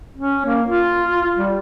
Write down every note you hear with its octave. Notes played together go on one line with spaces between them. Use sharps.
C#4
A#3
F4
G3